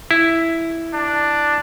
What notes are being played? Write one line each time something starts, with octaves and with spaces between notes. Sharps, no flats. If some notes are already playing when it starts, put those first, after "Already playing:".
E4
D4